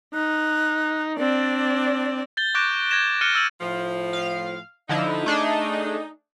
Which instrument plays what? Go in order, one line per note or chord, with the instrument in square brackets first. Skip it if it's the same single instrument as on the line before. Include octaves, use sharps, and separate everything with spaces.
[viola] D#4 [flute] F#6
[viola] C4 D5 [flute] D4
[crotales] G6 A6 G7
C#6 D6 F#6 G6 A#6 D7
G6
G6 G#6 A#6 E7
F6 F#6 A6 C#7 D#7 G7
E6 F6 A6 D#7 F#7
[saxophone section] A2 F3
[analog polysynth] F5
[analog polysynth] D3 F3 E4 [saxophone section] D#4
[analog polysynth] A3 D4 G#4